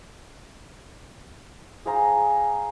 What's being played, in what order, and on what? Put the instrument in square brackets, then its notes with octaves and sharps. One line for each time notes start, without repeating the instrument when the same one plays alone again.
[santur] G#4 C5 F5 A#5